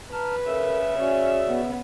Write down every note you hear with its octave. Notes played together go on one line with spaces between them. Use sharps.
B4 A5 A#5 F6
C#3 A4 A#4 E5
C#4 F#4 D5
B3